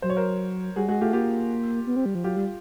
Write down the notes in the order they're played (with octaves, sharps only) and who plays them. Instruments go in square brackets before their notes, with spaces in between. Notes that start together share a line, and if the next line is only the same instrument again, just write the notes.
[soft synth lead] F#3 [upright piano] C5
[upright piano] C#5
A#4 C5
[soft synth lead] G3 [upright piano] F#4 G#4
[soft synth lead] G#3 [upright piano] F#4 G#4
[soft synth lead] A3 [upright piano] F4 G4
[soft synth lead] A#3 [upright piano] F4 G4
[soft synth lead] B3
C4
G3
F3
[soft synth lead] F#3 [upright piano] F4 G4
[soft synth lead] G3